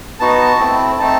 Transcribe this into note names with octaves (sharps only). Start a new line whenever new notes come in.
B3 D#4 F#4 A5
A3 C4 E4
A3 C4 D#4 A5